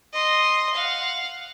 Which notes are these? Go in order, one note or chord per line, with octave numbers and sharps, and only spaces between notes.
D#5 C6
F5 F#5